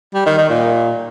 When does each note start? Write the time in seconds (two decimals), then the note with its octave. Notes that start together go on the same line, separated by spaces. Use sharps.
0.14 G3
0.26 D#3
0.38 D#3
0.49 A#2